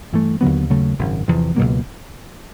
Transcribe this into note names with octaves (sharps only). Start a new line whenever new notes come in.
G2 E3 A3
D#2 D3 F#3 B3
D#2 C#3 F#3 A3
G#1 F#2 C#3
E2 C3 F3
C#2 B2 F#3 A#3